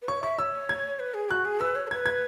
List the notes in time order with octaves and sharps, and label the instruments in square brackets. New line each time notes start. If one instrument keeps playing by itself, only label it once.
[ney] B4
[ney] C#5 [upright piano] C#6
[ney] E5 [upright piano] C#6
[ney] C#5 [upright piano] E6
[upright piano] G#6
[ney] B4
G#4
[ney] F#4 [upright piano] F#6
[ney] G#4
[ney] B4 [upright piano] E6
[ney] C#5
G#4
[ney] B4 [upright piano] G#6
[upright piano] G#6